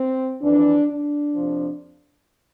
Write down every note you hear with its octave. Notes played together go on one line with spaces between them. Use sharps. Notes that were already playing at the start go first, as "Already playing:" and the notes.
Already playing: C4
F2 E3 D4
D4
F2 C3 F3